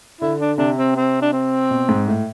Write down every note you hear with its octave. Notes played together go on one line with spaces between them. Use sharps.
D3 E4
D4
C3 D4
C4
C4
D4
C4
B2
G#2
A2